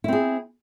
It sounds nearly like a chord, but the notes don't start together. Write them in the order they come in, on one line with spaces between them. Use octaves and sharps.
E4 C4 G#4